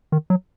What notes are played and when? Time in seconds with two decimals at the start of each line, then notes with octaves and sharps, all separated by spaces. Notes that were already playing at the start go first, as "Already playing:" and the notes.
0.12 D#3
0.30 F#3